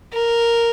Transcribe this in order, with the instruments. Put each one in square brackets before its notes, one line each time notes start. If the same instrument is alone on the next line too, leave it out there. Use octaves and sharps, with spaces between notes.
[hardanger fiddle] A#4